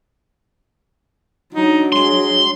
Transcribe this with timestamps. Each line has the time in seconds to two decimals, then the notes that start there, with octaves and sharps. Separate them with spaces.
1.54 F#3 D4 D#4
1.92 G#3 C6